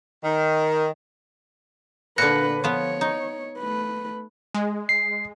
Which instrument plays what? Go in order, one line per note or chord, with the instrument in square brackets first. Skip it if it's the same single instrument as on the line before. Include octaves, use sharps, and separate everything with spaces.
[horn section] D#3
[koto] A#2 D3 [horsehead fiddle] D4 B4 [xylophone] F#6 A#6 C#7
[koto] F3 B3 [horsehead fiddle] C#5
[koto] D#4
[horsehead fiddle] A3 B4
[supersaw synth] G#3
[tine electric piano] C7